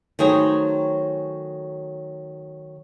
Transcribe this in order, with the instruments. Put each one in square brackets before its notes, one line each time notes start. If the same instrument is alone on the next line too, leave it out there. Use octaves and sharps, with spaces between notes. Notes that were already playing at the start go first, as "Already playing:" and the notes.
[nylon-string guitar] D#3 F#3 A3 G#4 C5 C#5